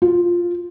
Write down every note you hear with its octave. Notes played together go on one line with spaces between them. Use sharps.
F4